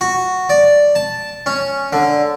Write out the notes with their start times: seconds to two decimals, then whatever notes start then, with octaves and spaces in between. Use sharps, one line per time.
0.01 F#4
0.49 D5
0.95 A5
1.46 C#4
1.93 D3